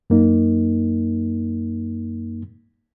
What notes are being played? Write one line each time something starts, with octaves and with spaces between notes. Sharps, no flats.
F#2 A#3 D#4